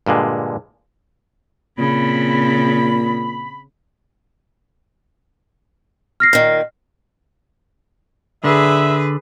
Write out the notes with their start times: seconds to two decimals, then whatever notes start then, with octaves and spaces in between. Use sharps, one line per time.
0.06 G2 A#2 D3 G#3
1.79 A#2 C#3 C4 B5
6.20 F6 A#6 C7
6.33 A#2 D#3
8.44 D3 G#4 B4 E5